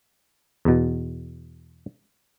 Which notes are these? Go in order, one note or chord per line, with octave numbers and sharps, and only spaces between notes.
E2 B2